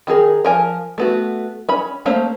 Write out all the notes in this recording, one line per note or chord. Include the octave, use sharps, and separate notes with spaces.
D#3 D#4 G#4 A#4
F3 A#4 G#5
A3 B3 F#4
C#4 B5
A3 A#3 C#4 C5